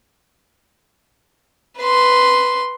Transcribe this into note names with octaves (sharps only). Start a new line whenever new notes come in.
B4 C6